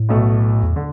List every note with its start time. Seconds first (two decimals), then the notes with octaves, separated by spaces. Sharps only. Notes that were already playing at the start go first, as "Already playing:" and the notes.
Already playing: A2
0.09 B1 B2 A3
0.63 E2
0.76 D3